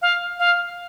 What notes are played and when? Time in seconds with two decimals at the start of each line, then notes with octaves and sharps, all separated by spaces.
0.02 F5
0.39 F5